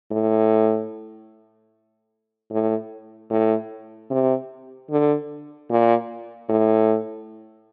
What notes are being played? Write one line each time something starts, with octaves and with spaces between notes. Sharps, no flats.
A2
A2
A2
C3
D3
A#2
A2